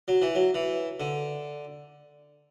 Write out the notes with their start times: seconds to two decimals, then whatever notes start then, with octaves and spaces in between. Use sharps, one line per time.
0.08 F#3
0.22 E3
0.35 F#3
0.54 E3
1.00 D3